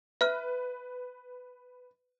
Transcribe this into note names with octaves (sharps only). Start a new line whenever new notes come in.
B4 E5 F6